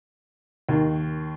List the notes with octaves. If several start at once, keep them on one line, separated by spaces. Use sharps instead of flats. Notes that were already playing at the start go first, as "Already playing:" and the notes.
D#2 D#3